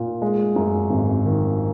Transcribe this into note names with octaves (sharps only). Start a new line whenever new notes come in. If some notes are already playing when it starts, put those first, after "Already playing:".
Already playing: A#2
G#3
F#2
G#1
D#3